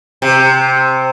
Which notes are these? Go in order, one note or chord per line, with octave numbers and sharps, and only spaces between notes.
C3